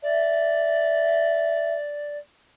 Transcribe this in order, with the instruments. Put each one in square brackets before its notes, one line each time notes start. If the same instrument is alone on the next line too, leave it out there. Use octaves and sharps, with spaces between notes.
[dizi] D5 [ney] E5